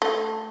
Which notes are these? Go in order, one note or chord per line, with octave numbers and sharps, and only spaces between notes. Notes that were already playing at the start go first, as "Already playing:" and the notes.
A3